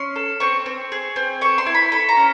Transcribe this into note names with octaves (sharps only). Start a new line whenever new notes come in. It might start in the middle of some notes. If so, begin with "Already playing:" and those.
Already playing: C#4 C6
A4
C4 C#6
C4
G#4
C4
A4 C#6
C6
E4
B5
A4 B5
A#5
C#4